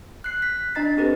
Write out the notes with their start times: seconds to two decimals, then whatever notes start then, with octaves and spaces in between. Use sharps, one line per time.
0.24 F#6 C7
0.42 B6
0.75 D4 D#5 A#5 A6 C7
0.97 C4 G4 A4 B4